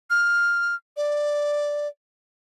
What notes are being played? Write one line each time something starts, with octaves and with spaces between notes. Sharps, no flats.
F6
D5